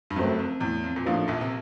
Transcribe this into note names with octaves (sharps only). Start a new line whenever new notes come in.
G2
F#1 F#2 F#3 A3 C4
F2
E2 A2
F2
A#2
A1 A2 F3 A#3 D4 F4
A#1 A#2
C3